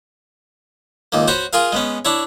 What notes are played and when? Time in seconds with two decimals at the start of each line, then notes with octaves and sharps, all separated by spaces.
1.12 C#2 D#3 A#3
1.28 F#4 C5 C#5 B5
1.53 F4 G#4 A#4 F5
1.72 G#3 B3 C#4
2.05 D4 E4 C#5